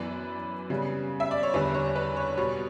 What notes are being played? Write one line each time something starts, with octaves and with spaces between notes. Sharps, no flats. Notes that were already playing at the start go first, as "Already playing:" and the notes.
Already playing: F#2 E3 B3 B4 D5
C#3 G3 B3
E5
D5
C#5
E2 D3 G3 B4
C#5
B4
C#5
B2 G3 B3 C#5